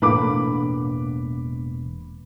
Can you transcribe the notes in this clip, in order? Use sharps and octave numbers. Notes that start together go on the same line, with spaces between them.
E1 A2 A#3 D4 B4 B5 D6